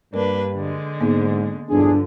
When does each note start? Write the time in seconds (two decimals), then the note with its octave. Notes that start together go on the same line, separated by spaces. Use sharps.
0.14 G2 A#3 D4 A#4 B4
0.56 D3 G#3
1.01 G#2 A#3 B3
1.69 B1 E2 G2 D3 F3 D4 G#4